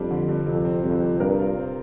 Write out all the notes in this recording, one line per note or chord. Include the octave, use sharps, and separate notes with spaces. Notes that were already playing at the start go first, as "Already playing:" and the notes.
Already playing: F2 G3 D4
D3
G2
F2 C3
C4
F2 G3
C3
G2 A#4
F4
C4